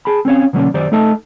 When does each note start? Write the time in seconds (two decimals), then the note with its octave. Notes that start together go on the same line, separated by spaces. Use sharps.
0.05 G#4 A5 B5
0.25 C4 C#4 C#5 F5
0.53 B2 D3 F#3 A#3 C#4 D4
0.74 F#2 D#3 G4 C5 D5
0.92 A3 D#4 A4 D#5 A5